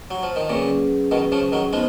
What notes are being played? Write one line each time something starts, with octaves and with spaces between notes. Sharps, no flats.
F#3
F3
D#3
A#2 C#3 F#3 C#4 G#4 B4
B2 D#3
C#3 F3
D#3 F#3
F3 G#3 B3 D#4